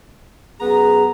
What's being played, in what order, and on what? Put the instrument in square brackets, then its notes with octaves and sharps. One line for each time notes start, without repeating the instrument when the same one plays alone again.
[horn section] F#2 B3 A#5 [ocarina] G#4